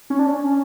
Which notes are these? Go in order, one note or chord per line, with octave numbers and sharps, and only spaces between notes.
C#4
D4
C#4